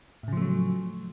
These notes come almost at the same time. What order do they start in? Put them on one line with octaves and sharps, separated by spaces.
A2 C#3 F3 A3 F#3